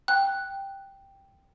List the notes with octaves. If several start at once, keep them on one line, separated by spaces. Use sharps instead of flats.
G5 F#6